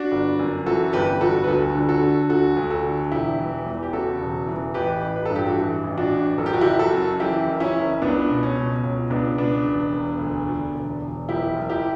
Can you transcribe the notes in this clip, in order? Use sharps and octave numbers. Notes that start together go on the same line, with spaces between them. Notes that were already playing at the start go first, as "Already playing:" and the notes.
Already playing: D4 F#4
G1
F#2
E3 F#4 A4
G1 G4 B4
G1 F#4 A4
B4
D2 F#4 A4
D3
F#4 A4
D3
D2 F#4 A4
D2
F#4 A4
D3
E1 E4 G4
E3
E2
G4
C#3 F#4 A4
E1
E3
A1 G4 B4
A1
B4
G2 A4
G4
F#4 A4
E3
A1
D4 F#4
A1
F#1 A4
G4
F#4
F#1 E4 G4
F#4 A4
F#2
E3 E4 G4
F#1
C#4 E4
F#1
C#2 B3 D4
B2
C#4
B2
C#2 C#4
C#2 B3 D4
B2 B3 D4
E1
E1
D2
D3
E1
E1
F#1 E4 G4
F#1
E4 G4